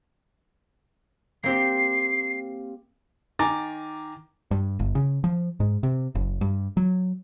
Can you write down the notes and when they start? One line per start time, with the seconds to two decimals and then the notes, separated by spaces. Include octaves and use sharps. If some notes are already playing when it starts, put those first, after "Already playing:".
1.43 A#3 C4 G4 C7
3.39 D#3 G#5 A#5 D6 A6
4.51 G2
4.79 G1
4.95 C#3
5.24 F3
5.60 G#2
5.83 C3
6.15 F#1
6.41 G2
6.77 F#3